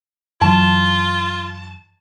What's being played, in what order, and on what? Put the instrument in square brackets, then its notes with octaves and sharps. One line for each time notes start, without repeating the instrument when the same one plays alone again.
[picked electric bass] F#2 E3 F#3 [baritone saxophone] F4 [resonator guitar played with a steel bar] A5